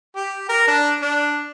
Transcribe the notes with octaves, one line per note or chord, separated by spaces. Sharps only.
G4
A#4
D4
D4